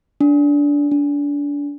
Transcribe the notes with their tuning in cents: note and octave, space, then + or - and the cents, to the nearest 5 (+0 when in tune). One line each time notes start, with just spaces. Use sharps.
D4 -20
D4 -30